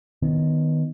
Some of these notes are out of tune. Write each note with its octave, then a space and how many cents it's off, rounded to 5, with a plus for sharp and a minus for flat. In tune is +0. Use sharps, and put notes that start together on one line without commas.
D#3 +0 B3 +0